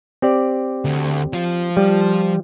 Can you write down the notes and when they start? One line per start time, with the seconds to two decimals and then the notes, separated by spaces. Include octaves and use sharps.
0.22 C4 G4 D5
0.85 D2
1.33 F3 F4
1.77 G3